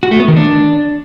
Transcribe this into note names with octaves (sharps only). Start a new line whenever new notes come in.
F#4
A3
B3
D#3
D4